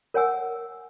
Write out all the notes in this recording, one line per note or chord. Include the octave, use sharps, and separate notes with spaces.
A#4 C#5 F#5 G#5 E6